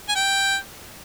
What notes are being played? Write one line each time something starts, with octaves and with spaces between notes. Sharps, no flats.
G#5
G5